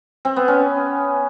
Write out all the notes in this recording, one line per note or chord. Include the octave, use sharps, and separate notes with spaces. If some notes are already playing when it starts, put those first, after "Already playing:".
C4
B3
C#4